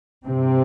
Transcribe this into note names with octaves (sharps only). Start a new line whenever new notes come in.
G2 C3 C4